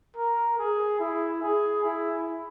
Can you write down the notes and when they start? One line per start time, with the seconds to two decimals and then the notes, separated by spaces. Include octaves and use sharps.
0.17 A#4
0.59 G#4
1.00 E4
1.42 G#4
1.84 E4